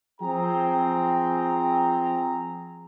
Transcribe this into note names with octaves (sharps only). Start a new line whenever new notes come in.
F3 C4 G#4 G5 A#5